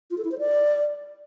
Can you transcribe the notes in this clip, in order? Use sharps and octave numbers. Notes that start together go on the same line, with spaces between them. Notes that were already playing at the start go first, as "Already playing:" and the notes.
F4
A4
E4
C5
D5